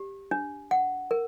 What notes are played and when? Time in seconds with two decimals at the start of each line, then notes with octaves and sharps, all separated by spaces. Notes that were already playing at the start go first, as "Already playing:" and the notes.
Already playing: G4
0.31 D4
0.71 F#5
1.11 A#4